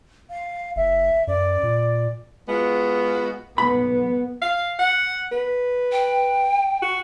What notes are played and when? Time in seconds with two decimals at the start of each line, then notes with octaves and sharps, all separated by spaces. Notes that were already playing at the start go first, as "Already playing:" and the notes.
0.30 F5
0.76 F#1 E5
1.27 F#2 D5
1.63 A#2
2.48 G#3 B3 F4 F#4
3.58 B1 B3 B5
4.42 F5
4.79 F#5
5.32 B4
5.92 G5
6.82 F#4